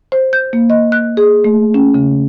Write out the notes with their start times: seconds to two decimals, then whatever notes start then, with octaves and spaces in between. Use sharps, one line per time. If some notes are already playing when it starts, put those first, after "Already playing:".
0.12 C5
0.33 G6
0.53 A#3
0.70 D#5
0.92 F#6
1.17 G#4
1.44 A3
1.74 C#4
1.94 C#3